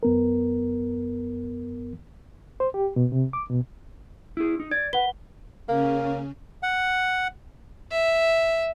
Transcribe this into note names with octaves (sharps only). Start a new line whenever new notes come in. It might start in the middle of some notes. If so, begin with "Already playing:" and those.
F#2 B3 A#4
C5
G4
B2
C3
D6
B2
E4 G#4
D#4
D5 G#6
B4 F#5 G7
C#3 A#3 C#4
F#5
E5